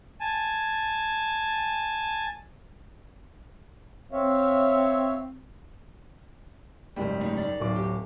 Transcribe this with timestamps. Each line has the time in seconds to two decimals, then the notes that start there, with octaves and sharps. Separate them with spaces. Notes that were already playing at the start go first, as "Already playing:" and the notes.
0.20 G#5 A5
4.12 C4 C#5 E5 F5
6.96 F#1 G#2 G3
7.21 A3 D#4
7.37 D#4 D5
7.60 D1 F#2 D6
7.76 G4